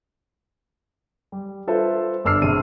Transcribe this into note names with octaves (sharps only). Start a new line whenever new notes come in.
G3
F4 A4 B4 C5 E5
G1 G2 D4 E6 F6 C7
A#1 C3 G#4 D#7